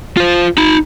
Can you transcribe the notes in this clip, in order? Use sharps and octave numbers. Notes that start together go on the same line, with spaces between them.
F4 C5
D#4 B5